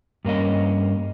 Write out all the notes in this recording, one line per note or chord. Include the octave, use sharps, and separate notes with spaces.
G2 A#3 C#4 D#5